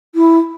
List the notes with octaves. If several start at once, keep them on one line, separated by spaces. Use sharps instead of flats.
E4